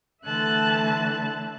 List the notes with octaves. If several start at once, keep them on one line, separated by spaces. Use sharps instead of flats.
D3 E3 A3 E5 A5 F#6